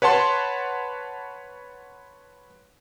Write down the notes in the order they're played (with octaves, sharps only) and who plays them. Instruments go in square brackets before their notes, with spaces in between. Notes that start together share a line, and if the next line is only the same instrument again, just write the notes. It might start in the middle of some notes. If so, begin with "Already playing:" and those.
[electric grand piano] B4 C#5 F#5 A5 C6